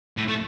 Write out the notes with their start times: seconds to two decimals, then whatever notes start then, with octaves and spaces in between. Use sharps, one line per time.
0.17 A2
0.28 A3